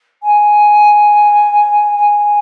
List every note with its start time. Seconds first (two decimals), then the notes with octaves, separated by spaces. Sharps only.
0.22 G#5
1.96 G#5